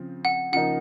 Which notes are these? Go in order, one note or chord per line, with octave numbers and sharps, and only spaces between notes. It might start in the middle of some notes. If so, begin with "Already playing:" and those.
Already playing: C#3 F3 C4
F#5
C#3 F3 A#3 D#4 F#5